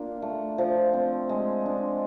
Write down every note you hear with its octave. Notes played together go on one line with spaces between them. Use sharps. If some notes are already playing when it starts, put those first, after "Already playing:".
Already playing: A#3 D4 F4
A3
F3
C4
G#3
D4